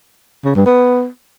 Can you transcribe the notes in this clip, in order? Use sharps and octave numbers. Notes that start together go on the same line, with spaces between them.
C#3
G2
B3